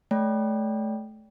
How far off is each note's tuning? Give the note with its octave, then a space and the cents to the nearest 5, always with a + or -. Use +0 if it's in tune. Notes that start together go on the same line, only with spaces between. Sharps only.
A3 -30 D5 -45 G5 +0